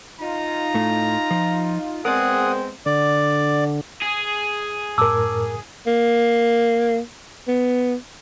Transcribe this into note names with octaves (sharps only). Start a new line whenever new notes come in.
D#4 F4 A#5
A2 A3
F3
G#3 B3 C4 G#4 A#4 D5 F#5 D#6
D3 D5
G#4
F#2 A2 A#4 A5 D6 E6
A#3
B3